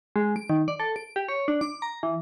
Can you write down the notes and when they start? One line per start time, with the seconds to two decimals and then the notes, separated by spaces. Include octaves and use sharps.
0.16 G#3
0.36 D7
0.50 D#3
0.68 D5
0.80 A4
0.96 D7
1.16 G4
1.28 C#5
1.48 D4
1.61 D6
1.82 A#5
2.03 E3